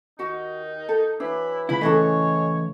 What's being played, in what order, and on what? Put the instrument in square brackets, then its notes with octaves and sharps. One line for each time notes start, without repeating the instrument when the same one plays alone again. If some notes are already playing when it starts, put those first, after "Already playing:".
[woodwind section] D#2 D#3 D#4 [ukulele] F#4 F#5
[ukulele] A4
[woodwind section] E3 F#3 E4 [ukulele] D4
[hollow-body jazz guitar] C#2 E4 [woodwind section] C#3 B4 B5
[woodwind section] A2 G#3 C#5 [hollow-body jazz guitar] C#3 E3 A3 [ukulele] A4 D#5